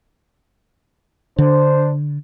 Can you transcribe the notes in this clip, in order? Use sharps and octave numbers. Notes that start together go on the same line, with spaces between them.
D3 D4 C5